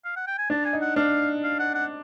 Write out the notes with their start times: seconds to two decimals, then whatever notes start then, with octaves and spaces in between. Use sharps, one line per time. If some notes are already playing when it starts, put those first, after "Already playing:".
0.05 F5
0.17 F#5
0.27 G5
0.38 G#5
0.50 D4 A5
0.65 G#5
0.73 D#4
0.81 F#5
0.96 D4 F5
1.44 F5
1.59 F#5
1.74 F#5